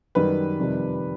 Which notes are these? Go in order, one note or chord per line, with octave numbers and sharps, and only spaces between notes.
F#2 D#3 G3 B4
F2 C3 D#3 G3